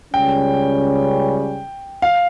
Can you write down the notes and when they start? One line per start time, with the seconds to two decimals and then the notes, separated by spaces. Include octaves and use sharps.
0.13 C#2 C#3 G3 C#4 G5
2.02 F5